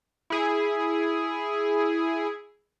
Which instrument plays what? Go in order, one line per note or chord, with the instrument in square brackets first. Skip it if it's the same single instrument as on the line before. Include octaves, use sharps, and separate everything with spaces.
[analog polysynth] E4 G#4